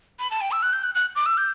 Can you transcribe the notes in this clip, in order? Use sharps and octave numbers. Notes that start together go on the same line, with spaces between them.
B5
A5
G5
E6
F#6
G6
F#6
F#6
D6
E6
G6